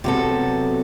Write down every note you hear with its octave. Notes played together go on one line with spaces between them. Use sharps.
C3 F#3 B3 F#4 A4